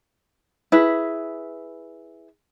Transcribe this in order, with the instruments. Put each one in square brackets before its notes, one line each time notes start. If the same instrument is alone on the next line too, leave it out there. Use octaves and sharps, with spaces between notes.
[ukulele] E4 G#4 B4